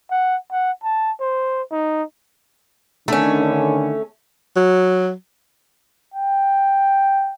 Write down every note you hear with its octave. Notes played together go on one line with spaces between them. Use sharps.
F#5
F#5
A5
C5
D#4
D3 D#3 A3 C#4
F#3
G5